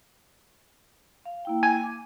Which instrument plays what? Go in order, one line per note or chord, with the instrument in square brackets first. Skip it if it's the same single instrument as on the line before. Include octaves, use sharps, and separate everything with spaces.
[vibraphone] F5
A#3 E4 G5
[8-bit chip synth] G#5
[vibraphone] D6